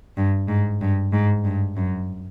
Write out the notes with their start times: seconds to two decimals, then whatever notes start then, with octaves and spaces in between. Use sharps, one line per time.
0.17 G2
0.49 G#2
0.81 G2
1.13 G#2
1.44 G2
1.77 F#2